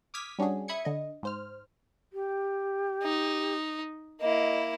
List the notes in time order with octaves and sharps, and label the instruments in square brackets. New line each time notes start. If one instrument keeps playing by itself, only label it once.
[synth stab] D6 D#6 F6 G#6 B6
G3 C#4 D4 F#4 G#4
E5 B5 D#6 G#6 C#7
D3 D#5
G#2 C5 F6
[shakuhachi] G4
[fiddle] D#4
[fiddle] A#3 E4 [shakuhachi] D#5